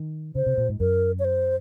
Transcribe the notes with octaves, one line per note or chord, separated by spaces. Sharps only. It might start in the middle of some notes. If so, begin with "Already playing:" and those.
Already playing: D#3
C#3 C5
C3
A#2
G#2
F#2 A#4
C#5
C5